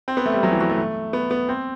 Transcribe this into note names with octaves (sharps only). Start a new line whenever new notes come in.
C4
B3
A3
G3
F#3
E3
F#3
A3
B3
B3
C4